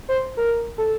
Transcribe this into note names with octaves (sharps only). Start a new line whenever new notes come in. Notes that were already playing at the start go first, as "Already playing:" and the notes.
C5
A#4
A4